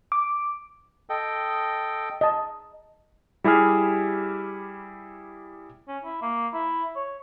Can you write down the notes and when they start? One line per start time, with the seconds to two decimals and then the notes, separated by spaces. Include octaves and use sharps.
0.12 D6
1.10 A4 D#5 G5
2.21 D#5 A5
3.44 G3 E4 G4 G#4 F6
5.88 C#4
6.04 E4
6.22 A#3
6.54 E4
6.96 C#5